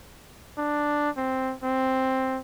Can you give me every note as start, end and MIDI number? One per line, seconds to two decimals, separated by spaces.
0.58 1.09 62
1.17 1.53 60
1.63 2.40 60